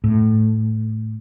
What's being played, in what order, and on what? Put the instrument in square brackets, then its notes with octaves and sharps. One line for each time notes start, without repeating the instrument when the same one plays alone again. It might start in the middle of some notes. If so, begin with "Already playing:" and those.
[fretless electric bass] A2